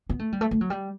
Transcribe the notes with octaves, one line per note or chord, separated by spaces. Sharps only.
B3
A3
G3
A3
A3
F#3
G3